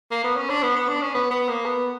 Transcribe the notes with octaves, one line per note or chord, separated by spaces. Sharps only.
A#3
B3
C#4
D4
B3
B3
D4
C#4
B3
B3
A#3
B3